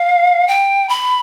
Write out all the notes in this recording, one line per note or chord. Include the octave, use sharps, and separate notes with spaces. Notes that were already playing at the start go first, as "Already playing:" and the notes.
Already playing: F5
G5
B5